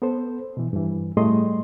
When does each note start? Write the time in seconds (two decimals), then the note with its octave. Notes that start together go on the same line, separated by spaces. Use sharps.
0.02 B3 A4 C5
0.57 B2 E3
0.73 G2 E3
1.17 A2 G3 A3 G#4 D#5 C6